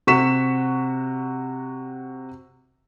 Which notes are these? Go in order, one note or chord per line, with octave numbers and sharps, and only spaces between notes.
C3 F#4 C#6 B6 E7